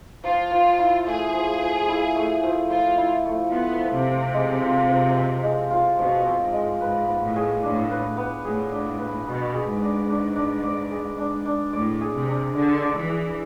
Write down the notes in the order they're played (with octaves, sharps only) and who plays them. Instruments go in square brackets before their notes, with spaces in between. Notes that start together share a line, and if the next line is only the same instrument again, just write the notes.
[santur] F3 [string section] F4
[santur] F3
E4
[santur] A3 [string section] G#4
[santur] F3
F3
E4
A3
F3
[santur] F3 [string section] F4
[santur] E4
A3
[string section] B3 [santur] F4
[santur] F3
[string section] C3
[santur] C4
G#3
F4
F3
C4
G#3
F4
[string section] B2 [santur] F3
[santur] C4
[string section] G#2
[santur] G#3
[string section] G#2 [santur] B4
[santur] B3
[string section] A2
[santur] G#4
[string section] A2 [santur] D4
[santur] B4
B3
[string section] A2 [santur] G#4
[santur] D4
B4
[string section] B2 [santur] B3
[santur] G#4
[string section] G#2
[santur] D4
D4
D4
D5
G#4
D4
D4
[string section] A2 [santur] D5
[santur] G#4
[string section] C3
[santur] D4
[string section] D3 [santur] D4
[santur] D5
[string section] E3
[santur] G#4